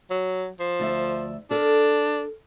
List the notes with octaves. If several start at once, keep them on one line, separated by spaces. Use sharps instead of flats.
F#3
F3
D2 D5 E5
D4 A4 A#4